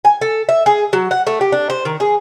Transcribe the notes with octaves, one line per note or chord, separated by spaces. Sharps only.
G#5
A4
E5
G#4
F#3
F#5
A3
G4
D4
C5
D#3
G#4